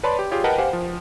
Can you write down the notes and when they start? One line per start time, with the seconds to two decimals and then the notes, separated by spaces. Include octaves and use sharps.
0.03 B4 C#5 D5 A5 B5 C6
0.19 G4
0.31 F4 G4 G#4 C#5
0.44 A#4 B4 D#5 F#5 G5 A5
0.58 G4 C5 F5 F#5 G#5
0.73 F3